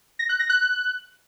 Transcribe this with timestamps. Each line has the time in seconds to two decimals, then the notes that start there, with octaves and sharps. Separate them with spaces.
0.19 A#6
0.29 F#6
0.39 A#6
0.49 F#6